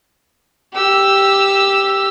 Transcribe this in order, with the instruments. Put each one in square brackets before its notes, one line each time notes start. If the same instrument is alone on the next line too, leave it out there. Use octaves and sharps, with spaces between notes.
[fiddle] G4 E6